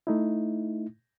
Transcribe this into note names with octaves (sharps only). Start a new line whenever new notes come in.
A3 D#4 E4